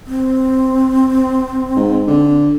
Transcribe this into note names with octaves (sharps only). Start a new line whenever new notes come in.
C4
G#2
D3